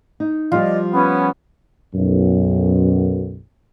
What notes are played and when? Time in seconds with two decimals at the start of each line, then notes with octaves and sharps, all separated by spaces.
0.20 D#4
0.52 F3 G3 F4 G4 D5 D#5
0.93 B3 C#4
1.94 B1 F#2